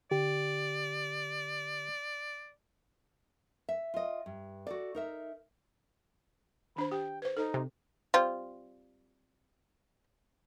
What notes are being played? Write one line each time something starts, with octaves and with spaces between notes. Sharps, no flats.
D3 G4 D5
E5
F4 D#5
G2
F#4 A4 D5
D#4 A#4 E5
D#3 D4 C5 B5
G4 G5
B4 C5
D#4 A4 C5
C3
G3 C4 F4